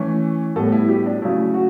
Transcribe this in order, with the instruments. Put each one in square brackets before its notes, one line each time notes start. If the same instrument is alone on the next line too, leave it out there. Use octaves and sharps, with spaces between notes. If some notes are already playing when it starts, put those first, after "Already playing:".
Already playing: [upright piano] E3 A3 C#4
A2 G3 B3 A4
E4
G4
D4
C#3 F#3 A3 E4
F#4